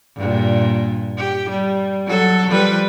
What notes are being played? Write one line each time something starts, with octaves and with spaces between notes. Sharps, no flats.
G2 A#2
G4
G3
F#3 A4
F3 G3 B4